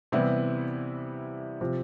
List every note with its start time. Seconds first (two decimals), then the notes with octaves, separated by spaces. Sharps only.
0.12 C3 E3 G3 B3 E4
1.61 C3 F3